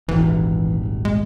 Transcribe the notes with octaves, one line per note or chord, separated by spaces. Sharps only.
D#1 G#1 E3
G#3